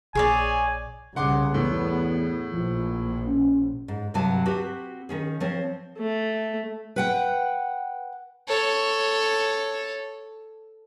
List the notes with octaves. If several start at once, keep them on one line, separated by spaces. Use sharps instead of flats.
A#1 G#4 C#5 D5 G#5
C2 C#3 F#5 C6 D6
E2 A2 B3
A#1 F3
C#4
G#2
D2 G2 C3 F#3 G#5 A5
C4 F#4 G4 B4
D#3 C#4 G#4
F3 C4 C5 C#5
A3
B4 F#5 G5
A4 C#5